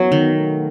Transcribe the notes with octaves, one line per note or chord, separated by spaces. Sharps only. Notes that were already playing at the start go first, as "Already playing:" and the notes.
Already playing: F#2 E3 F#3 B3
D#3
B2 A3 D#4